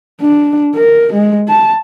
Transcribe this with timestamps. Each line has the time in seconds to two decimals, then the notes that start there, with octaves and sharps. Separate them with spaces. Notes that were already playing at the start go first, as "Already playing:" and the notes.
0.22 D4
0.76 A#4
1.13 G#3
1.48 A5